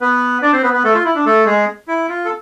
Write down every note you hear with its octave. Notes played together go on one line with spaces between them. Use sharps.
B3 B4
D4 D5
C4 C5
B3 B4
B3 B4
A3 A4
F4
E4
D4
A3 A4
G#3 G#4
E4
F4
A4